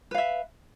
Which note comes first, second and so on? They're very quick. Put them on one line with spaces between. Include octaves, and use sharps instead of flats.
B4 F5 E5